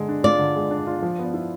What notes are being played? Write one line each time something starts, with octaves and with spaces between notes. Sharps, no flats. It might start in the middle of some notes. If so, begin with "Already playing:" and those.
Already playing: D3 G#3
D4
F4 D5
D3
G#3
D4
F4
F3
B3
E4